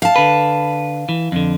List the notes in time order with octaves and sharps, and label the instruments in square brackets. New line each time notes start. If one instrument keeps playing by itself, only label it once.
[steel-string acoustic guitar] F5 A5
[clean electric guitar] D3 B4
E3
F2 D3